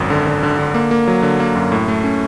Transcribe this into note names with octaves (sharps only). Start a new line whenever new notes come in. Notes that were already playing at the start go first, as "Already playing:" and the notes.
Already playing: G#1 F#2
D3
D3
D3
D3
A#3
A#3
F#3
D3
A#3
F#2
A2
A3
C#4